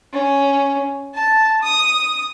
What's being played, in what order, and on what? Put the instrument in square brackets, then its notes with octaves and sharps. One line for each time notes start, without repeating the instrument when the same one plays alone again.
[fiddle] C#4
A5
D#6